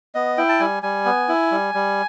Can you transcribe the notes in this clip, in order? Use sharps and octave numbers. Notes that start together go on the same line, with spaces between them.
B3 D#5
E4 G5
A5
G3 G#5
G3 G#5
B3
E4
G3
G3